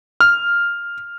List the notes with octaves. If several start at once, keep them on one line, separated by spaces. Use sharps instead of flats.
F6